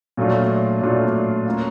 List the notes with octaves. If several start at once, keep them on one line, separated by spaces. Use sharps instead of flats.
A#2 F#3 A3 D4 F4
A#2 F#3 A3 D4 F4
A#3 C#4 F4